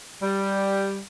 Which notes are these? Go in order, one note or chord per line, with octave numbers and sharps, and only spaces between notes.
G3